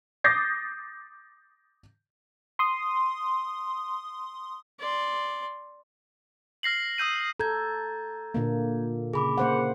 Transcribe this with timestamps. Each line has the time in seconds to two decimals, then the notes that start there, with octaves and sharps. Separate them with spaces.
0.24 D6 D#6 G6 A6 A#6 C7
2.59 C6 D#6
4.80 D5 C6
6.63 F6 A#6 C7 F#7
6.98 D#6 E6 G6 D#7
7.40 A4 A#5 G6 G#6
8.34 A#2 D3 A#3
9.14 C#3 G#4 B5 D6
9.38 A#3 C5 F#5